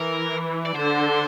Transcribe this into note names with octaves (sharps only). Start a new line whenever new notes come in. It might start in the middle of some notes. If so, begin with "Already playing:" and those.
Already playing: E3 A#4
D5
D3 C5